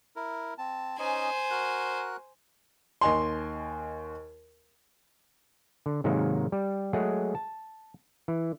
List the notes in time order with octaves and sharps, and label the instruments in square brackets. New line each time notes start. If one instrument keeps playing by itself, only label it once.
[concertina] E4 A#4
C4 A5
[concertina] C#4 D#4 D#5 [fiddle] C5 G#5
[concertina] F#4 A#4 F#6
[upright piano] D#2 D#5 G#5 C6
[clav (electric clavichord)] D3
G#2 C3 D#3 F#3 G#3 A#3
G3
F#3 G#3 A3 G#4 F#5
A5
E3